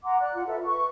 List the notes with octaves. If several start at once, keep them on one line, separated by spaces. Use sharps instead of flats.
F#5 A#5 C6 D6
D5 F#6
F4 F#5
A4 B4 E5
B4 C#6